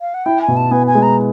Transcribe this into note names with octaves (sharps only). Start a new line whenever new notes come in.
F5
F#5
E4 G5
G#5
B2
A5
B3 G#5
G#5
G#3
A#5